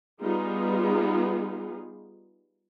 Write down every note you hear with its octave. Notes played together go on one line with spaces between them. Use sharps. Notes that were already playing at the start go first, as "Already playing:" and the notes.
G3 B3 D#4 F4 G#4